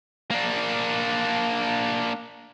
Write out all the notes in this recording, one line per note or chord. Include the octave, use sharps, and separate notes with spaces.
A#3 D4